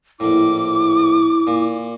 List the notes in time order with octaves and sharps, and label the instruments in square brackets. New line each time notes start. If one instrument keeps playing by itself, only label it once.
[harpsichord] A#1 A2 [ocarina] E4 [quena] D6
[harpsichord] A#2